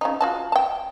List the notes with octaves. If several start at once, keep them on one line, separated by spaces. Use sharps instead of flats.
C#3 F3 D#4
F4 F#4 A5
G5 A5